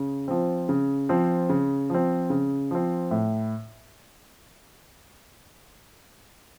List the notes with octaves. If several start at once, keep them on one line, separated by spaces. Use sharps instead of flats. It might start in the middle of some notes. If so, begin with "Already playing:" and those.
Already playing: C#3
F3 C4
C#3
F3 C4
C#3
F3 C4
C#3
F3 C4
A2